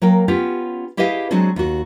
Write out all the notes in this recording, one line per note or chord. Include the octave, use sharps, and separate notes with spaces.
F#3 A#3 A#4 G5
B3 C#4 F4 G4
E4 G4 G#4 B4 D#5 F5
F#3 G#3 C4 D4 F#4 G#4
D#2 F#4